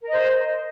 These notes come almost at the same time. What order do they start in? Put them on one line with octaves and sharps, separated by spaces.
A#4 D#5 C5